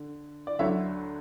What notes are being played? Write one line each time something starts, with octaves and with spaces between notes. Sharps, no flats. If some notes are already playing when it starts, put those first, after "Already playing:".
Already playing: D3
D5
D2 D3 F#3 C#5 E5